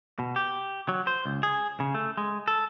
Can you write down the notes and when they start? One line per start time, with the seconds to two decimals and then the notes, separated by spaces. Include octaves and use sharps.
0.19 B2
0.36 G4
0.89 F#3
1.07 C5
1.26 C#2
1.43 G#4
1.80 C#3
1.95 A3
2.17 G#3
2.48 A4